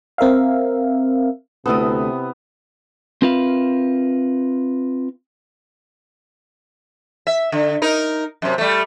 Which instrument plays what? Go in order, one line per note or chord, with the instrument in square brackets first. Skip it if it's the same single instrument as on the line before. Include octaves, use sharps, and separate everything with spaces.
[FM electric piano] C4 A#4 E5 F5
[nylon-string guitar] D2 A4 [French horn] C3 [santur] B3 E4 D#6
[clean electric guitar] C4 F4 A#4 B4 E5 F5
[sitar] E5
D3
D#4 A#4
F#2 C3
G3 A3